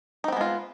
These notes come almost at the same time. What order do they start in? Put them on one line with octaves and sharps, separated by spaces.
D#4 C4 B3 G#3 F4